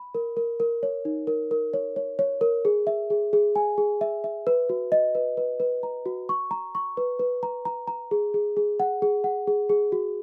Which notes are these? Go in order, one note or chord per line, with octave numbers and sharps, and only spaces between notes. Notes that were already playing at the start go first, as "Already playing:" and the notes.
Already playing: B5
A#4
A#4
A#4
C#5
D#4
A#4
A#4
C#5
C#5
C#5
A#4
G#4
E5
G#4
G#4
G#5
G#4
E5
E5
B4
F#4
D#5
B4
B4
B4
A#5
F#4
C#6
A#5
C#6
B4
B4
A#5
A#5
A#5
G#4
G#4
G#4
F#5
G#4
F#5
G#4
G#4
F#4